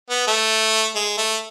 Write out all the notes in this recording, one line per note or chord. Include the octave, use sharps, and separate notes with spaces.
B3
A3
G#3
A3